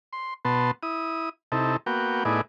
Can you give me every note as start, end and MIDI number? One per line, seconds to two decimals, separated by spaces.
0.13 0.34 84
0.45 0.71 47
0.45 0.71 59
0.45 0.71 81
0.45 0.71 84
0.83 1.29 64
0.83 1.29 87
1.52 1.76 48
1.52 1.76 63
1.52 1.76 64
1.52 1.76 69
1.86 2.24 58
1.86 2.24 59
1.86 2.24 66
1.86 2.24 79
2.25 2.41 45
2.25 2.41 59
2.25 2.41 63
2.25 2.41 64
2.25 2.41 68
2.25 2.41 74